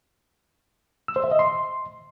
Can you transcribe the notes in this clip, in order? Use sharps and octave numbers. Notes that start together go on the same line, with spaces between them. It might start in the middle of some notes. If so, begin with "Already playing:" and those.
E6
C5
E5
D#5
C6